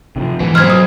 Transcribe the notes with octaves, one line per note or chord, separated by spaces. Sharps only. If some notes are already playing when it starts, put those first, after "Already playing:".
C3 D#3 F3
G#2 B2 E3
F#3 C5 D#5 F6 G#6
D#6